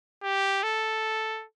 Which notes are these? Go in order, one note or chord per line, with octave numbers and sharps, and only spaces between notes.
G4
A4